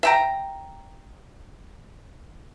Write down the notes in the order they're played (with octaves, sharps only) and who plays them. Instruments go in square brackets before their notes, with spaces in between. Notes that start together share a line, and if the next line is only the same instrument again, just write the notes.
[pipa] E5 G5 A#5